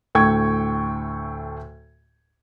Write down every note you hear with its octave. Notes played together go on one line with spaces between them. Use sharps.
D2 A2 A4 G5 C#6 G#6